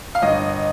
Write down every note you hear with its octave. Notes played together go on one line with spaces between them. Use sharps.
F5
G1 D#5